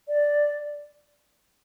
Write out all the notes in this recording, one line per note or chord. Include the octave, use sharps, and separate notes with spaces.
D5